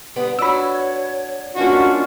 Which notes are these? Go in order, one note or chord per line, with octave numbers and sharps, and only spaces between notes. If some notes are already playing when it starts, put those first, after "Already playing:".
D3 G3 B3 D#6
D4 F#4 C#5 B5 E6
D#3 G3 A#3 C#4 D4 F4 F#4